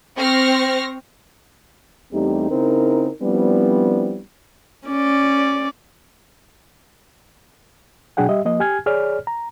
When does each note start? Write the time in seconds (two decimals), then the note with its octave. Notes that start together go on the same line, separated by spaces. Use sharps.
0.16 C4 C#6 F6 A#6
2.13 E2 G3 A3 C4 D#4 G4
2.50 C#3 C4 D#4 E4 A#4
3.22 F3 G3 B3 C4 D4 E4
4.88 C#4 D5
8.17 B2 F#3 D4 G#4 F#5 G5
8.29 G3 G4 D#5 E5
8.45 F3 A#3 D#5
8.60 G4 G#5 F6 G#6
8.86 G#4 C#5 D5 F6
9.27 A#5